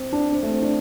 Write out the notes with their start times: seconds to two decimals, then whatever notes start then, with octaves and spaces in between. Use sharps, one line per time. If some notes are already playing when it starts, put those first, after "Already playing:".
Already playing: C4
0.12 D4
0.32 C4
0.43 A3
0.52 C4
0.62 D4